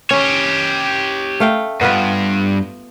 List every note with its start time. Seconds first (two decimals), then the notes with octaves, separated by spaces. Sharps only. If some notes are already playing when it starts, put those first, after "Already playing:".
0.11 C#4 G4 C#5
1.40 A3 F5 G5
1.81 G2 B3 F4 B4